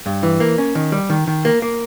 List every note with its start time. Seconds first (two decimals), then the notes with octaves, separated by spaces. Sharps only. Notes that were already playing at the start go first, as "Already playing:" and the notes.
0.06 G2
0.23 E3
0.40 A#3
0.58 C#4
0.75 D#3
0.92 G3
1.10 D#3
1.27 D#3
1.45 A#3
1.62 A#3